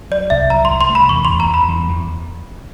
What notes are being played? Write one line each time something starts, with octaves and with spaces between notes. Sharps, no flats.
F#3 D5
C2 E5
F#3 A#5
C6
C2
C6
A3
B5
E2 C#6
E2 C6
A#5
E2 B5
E2
E2